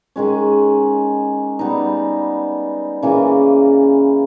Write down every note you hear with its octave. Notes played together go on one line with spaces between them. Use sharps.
D#3 G#3 C#4
G3 B3 D#4
C#3 E3 A#3